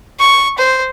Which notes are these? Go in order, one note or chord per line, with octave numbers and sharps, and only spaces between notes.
C#6
C5